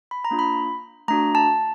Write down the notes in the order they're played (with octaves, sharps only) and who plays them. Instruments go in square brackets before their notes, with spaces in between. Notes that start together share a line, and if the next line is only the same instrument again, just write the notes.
[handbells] B5
A#5
A#3 D4 F4
B5
A3 D4 F#4 A#5
A5